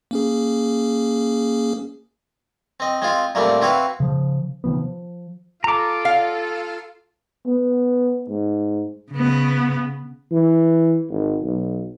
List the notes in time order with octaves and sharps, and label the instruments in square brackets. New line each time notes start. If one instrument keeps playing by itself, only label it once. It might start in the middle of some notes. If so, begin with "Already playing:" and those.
[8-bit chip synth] A#3 C#4 G#4
[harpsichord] C4 D#5
G#3 C4 F4
A#2 G3 A3 A#3 C4
C4 E4 F#4 B4 F5
[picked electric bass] C#3 F3
C3 D#3 F3 B3
F3
[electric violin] F4 A4 [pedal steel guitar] A#5 D6
[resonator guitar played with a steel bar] F5
[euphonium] B3
G#2
[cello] C#3 B3
[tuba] E3
G#1
B1